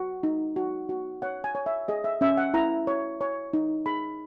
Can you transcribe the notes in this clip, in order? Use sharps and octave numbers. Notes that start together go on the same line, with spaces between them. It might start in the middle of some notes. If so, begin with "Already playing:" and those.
Already playing: F#4
D#4
F#4
F#4
C#5 F#5
G#5
C#5
E5
G#4 D#5
E5
C#4 E5
F#5
E4 A#5
C#5
C#5
D#4
G#4 B5